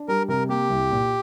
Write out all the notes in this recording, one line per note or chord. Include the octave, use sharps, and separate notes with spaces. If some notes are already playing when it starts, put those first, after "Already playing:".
Already playing: D4
G3 A#4
C3 A#4
A#3 G4
C2
A#2